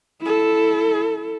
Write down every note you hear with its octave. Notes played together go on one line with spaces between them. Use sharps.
E4 A4